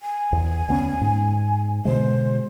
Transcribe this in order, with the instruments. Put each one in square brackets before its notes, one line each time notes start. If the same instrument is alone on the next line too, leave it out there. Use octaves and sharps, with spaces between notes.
[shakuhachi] G#5
[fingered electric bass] E2
D2 B3 C#4
G#2
[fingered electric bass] B2 D3 G#3 [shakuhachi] C5